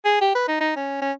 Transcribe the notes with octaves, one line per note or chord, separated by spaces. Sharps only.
G#4
G4
B4
D#4
D#4
C#4
C#4